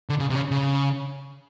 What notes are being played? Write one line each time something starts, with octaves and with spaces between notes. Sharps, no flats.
D3
C#3
C3
C#3
C#3